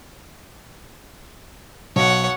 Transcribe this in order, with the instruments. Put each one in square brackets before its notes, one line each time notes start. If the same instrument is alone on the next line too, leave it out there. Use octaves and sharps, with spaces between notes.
[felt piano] B1 [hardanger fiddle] C#5 F#5